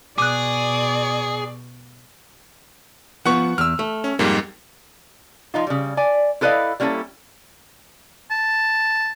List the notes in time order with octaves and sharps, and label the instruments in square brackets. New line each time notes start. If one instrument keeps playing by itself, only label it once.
[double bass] B2 [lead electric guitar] G#4 [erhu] D5 [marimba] D6 F#6
[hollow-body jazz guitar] F3 B3 [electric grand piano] F#5 C#6
[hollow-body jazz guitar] E2 [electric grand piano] E6 F6
[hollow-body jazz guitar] A3
[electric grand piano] C#4
[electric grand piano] F2 G#2 G3 [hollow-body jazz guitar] A#3
[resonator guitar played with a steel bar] F3 D#4 F4
C#3 G3
D5 G#5
E4 A4 B4 D5 D#5 F5
G3 A#3 C#4 E4 A4
[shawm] A5